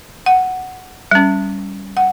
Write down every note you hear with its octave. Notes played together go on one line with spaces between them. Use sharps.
F#5
G3 C#4
F#5